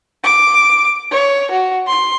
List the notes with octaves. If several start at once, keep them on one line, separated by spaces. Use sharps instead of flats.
D6
C#5
F#4
C6